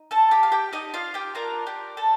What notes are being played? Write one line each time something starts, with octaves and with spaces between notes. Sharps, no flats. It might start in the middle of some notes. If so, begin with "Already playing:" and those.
Already playing: D#4
A4 A5
G4 G5
F5
G4 G5
D#4 D#5
F4 F5
G4 G5
D4 F4 A4 A#4 A#5
G4 G5
A4 A5